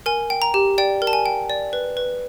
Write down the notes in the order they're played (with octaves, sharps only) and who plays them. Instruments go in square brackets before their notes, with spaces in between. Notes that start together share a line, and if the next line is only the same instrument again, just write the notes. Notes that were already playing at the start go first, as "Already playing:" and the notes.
[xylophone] A#4 G#5
G5
A#5
G4
D5 G5
A#4
A5
G#5
G5
D5
B4
B4